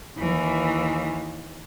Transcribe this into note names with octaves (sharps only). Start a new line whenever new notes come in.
D#2 E3